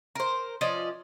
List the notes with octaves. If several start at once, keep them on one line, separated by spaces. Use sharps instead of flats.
A#4 C5
F3 C#4 D5 D#5